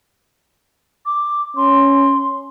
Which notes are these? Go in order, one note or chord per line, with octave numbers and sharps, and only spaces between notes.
D6
C#4 C6